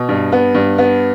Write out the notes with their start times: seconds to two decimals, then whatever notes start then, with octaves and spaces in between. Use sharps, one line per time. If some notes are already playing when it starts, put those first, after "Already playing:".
Already playing: B2
0.09 G2
0.32 B3
0.54 G2
0.78 B3